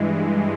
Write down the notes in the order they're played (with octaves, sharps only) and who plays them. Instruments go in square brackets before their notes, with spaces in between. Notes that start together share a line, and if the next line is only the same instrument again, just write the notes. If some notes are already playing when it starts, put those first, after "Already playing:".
Already playing: [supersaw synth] G2 E3 G#3